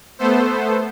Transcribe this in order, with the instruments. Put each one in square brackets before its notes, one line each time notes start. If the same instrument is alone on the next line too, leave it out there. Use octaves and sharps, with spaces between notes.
[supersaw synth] A3 B3 A4 C5